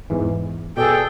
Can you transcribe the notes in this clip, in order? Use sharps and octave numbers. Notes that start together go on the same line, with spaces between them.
E2 G#2 E3
B2 G#4 A4 D5 G5